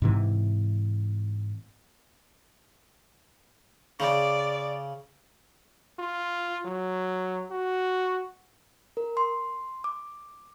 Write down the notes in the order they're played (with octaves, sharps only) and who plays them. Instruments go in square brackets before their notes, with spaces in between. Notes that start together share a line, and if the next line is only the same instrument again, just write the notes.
[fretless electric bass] G#2 C3 E3
[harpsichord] C#3 [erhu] D5
[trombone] F4
F#3
F#4
[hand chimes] A#4
C6
D6